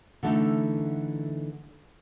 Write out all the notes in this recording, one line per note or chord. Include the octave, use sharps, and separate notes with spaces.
D3 E3 A3 C4 D#4